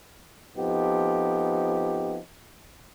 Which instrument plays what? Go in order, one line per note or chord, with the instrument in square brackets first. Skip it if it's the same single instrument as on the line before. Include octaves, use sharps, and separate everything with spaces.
[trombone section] F2 F3 B3 D#4 G4